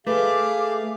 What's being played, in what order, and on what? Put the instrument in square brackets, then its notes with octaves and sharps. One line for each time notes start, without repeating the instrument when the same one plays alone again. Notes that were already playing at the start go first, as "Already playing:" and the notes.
[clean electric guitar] A3 [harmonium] G#4 F5 [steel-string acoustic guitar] B4 [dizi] D6